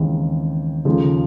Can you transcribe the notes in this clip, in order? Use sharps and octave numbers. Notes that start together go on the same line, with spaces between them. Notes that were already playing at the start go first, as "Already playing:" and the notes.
Already playing: D#2 C#3 E3 G#3 C4
D#2 C#3 F3 A3